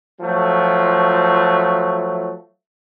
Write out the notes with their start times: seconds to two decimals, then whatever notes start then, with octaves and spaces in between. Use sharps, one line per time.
0.21 F3 F#3 A3